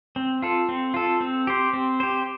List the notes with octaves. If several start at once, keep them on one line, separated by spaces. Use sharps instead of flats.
C4
F4 A4
C4
F4 A4
C4
G4 C5
C4
G4 C5